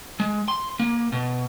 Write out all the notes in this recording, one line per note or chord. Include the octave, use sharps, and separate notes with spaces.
G#3
C6
A#3
B2